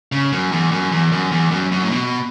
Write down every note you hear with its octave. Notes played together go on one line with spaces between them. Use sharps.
C#3
F#2
E2
F#2
E2
F#2
E2
F#2
F#2
A2
B2